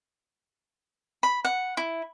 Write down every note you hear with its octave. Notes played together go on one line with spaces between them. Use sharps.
B5
F#5
E4